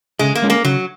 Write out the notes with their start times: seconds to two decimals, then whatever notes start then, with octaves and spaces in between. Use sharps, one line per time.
0.19 C#3 G#3
0.35 A#3
0.42 G#3 C#4 G#4
0.50 A#3
0.65 C#3 F#3